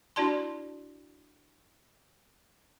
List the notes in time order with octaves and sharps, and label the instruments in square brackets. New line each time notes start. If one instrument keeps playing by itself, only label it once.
[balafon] D4 E4 F#4 D5 A5 C6